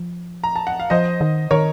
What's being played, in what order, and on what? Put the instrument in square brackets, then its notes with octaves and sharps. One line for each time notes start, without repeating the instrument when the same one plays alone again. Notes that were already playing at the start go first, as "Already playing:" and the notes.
Already playing: [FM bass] F3
[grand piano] A#5
A5
F#5
F5
[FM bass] F3 [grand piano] C5 D#5
[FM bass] D#3
[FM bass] D#3 [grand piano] A#4 C#5